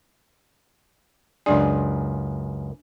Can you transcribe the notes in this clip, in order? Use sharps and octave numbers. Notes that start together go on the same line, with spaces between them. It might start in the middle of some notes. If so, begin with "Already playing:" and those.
C#2 F#2 D4 G#4 D5